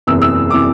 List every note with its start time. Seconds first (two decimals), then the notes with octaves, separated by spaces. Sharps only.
0.07 F#1 E2 C3 E3 E6
0.22 E6
0.50 C3 E3 D6